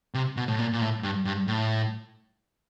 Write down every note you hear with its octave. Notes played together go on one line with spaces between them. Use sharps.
C3
B2
A2
A#2
A#2
A2
G2
G2
A2